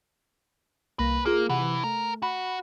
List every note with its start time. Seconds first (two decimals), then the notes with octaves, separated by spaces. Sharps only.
0.99 C2 A#3 B4 A#6
1.25 A#3 F4 G#4
1.49 C3 E3 F#5
1.84 A3 A#4
2.22 F#4 B5